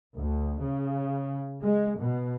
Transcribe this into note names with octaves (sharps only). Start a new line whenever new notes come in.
D2
C#3
G#3
B2